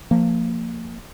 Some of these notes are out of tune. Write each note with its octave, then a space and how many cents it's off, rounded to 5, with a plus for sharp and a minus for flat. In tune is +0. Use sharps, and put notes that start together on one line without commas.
F3 +0 A#3 -25